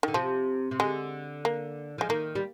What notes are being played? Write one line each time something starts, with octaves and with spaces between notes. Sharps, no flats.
D3 D#3
C3 F3
C3
D3 G#3
A#3
F3 G#3
D#3 A#3
G3